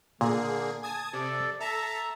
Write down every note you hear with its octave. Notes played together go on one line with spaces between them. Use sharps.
A#2 D3 A#3 G#4
G#5 A5 D#6 G#6
C3 A4 D5
A4 E5 A5 A#5